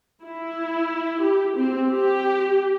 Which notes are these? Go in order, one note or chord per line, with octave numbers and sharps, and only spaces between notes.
E4
G4
C4
G4